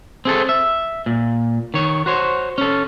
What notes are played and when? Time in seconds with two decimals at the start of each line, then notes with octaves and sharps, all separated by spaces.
0.25 C4 G#4 A4
0.49 E5
1.06 A#2
1.74 D#3 C#5
2.06 F#4 C5 C#5
2.58 C#4 A4